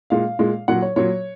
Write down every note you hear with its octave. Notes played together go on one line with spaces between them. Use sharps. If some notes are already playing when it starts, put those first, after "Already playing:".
A#2 G#3 F5
A#2 G#3
A#2 F#3 F#5
C#5
A#2 F#3 C#5